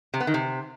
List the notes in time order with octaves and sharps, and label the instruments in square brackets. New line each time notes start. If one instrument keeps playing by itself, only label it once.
[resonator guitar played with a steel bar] C3
B3
D#3
C3